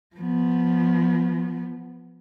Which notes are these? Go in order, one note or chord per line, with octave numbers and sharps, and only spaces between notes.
F3 B3